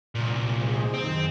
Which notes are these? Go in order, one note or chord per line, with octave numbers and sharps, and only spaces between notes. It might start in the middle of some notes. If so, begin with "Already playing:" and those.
C2 A#2
D#4 G#4 C5
F#2 D#3 C4